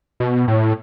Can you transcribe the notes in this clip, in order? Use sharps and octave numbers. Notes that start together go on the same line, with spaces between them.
B2
A2